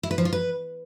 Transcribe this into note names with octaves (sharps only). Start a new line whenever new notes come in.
E4
B4
F3
F4
B4